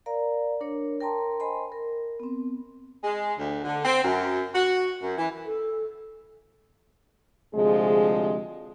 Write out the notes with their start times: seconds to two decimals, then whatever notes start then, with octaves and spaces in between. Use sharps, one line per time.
0.06 A#4 D5 F5 A#5
0.61 D4 A#4 C#5
1.00 A#4 G5 A5 A#5 C6
1.40 C5 D#5 G#5 B5 C6
1.72 A#4
2.20 B3 C4
3.03 G#3
3.37 D2
3.64 D3
3.85 C4
4.02 F#2
4.53 F#4
5.01 F#2
5.17 E3
5.45 A4
7.54 D2 C3 F3 G#3 G#4